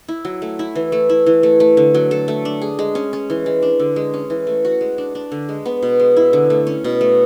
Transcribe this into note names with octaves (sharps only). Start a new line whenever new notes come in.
E4
F#3
A3
E4
E3
A3
E4
E3
A3
A3
D3
F#3
A4
A3
D4
G#4
G#3
C#4
C#4
E3
G#3
D4
D3
G#3
C#4
E3
A3
F#4
G#3
D4
D4
D3
G#3
B3
B2
G#3
E4
D3
A3
C#4
B2
A3